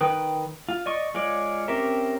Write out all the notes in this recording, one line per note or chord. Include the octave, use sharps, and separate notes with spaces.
D#3 B4 G5 D#6 F#6
F4
D5 D#5 C#6
G#3 F4 C#5 D5
C4 C#4 G4 A#4 E5